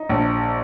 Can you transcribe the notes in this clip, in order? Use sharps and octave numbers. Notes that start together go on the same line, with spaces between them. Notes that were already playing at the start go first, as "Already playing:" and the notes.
Already playing: D#4
A#1